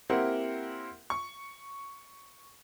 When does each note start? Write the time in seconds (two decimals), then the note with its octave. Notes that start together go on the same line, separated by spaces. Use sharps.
0.10 A#3 C4 E4 G4 A#4 F#5
1.10 C#6